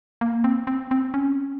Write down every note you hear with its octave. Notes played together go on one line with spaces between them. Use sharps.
A#3
C4
C4
C4
C#4